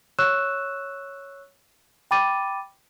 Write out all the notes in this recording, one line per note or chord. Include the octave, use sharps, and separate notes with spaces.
C#5 C#6 E6 F#6 E7
G5 B5 D6 A6 D#7